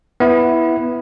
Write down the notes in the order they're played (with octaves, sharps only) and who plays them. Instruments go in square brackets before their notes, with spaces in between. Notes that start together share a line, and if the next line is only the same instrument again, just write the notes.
[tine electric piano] B3 E4